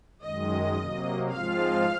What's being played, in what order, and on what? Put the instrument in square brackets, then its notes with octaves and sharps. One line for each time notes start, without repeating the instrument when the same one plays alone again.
[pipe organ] F#2 D#3 G#3 [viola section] D#5
[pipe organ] C3 F#3 A#3
[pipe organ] G#2 F3 G#3 C4 F4 [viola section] F5